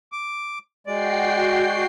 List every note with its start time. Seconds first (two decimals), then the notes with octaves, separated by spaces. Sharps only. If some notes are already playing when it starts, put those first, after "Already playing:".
0.12 D6
0.87 G#3 F#4 D5 G5 C7